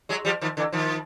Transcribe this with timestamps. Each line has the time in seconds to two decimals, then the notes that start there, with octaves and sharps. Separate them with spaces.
0.09 F#3 G#3
0.25 F3 G3
0.41 D#3 F3
0.57 D3 E3
0.72 D#3 F3